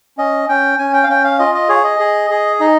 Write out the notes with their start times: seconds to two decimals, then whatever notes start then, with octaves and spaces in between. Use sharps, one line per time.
0.18 C#4 D#5
0.49 C#4 G5
0.79 C#4 G#5
0.94 G5
1.04 F5
1.09 C#4 G5
1.24 F5
1.39 F4 D#5
1.55 D#5
1.69 G#4 C#5
1.84 D#5
1.99 G#4
2.30 G#4
2.60 D#4 D#5